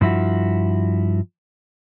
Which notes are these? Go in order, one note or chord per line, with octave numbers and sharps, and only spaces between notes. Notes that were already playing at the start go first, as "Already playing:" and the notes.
G2 F3 E4 F#4